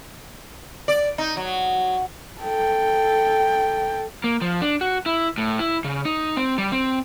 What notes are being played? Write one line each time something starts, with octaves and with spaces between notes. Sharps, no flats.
D5
D#4
F#3
A4 G5
A#3
F3
D4
F#4
E4
A2
E4
C#3
D#4
C4
G3
C4